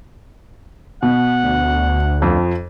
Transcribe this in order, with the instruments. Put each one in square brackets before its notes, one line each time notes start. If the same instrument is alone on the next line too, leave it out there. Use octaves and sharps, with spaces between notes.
[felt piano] B2 [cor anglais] F#5
[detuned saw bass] D2
[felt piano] F2 F3